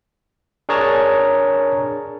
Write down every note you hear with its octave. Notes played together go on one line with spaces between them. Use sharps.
D4 G#4 A#4 C#5 A5 A#5